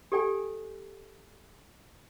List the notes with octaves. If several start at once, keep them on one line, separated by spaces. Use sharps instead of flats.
G4 A4 D5 G5 G#5